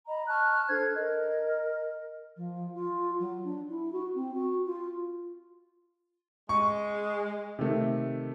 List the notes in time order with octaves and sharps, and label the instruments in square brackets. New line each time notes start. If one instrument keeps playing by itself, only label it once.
[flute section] D#5 A#5 B5
A5 C#6 F6 F#6
D4 A4 C5 G#6
A#4 D#5
[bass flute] F3
F4
F#3
D4
E4
F#4
C4
F#4
F4
[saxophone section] G#3 [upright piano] C#6
[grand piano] C3 D#3 A3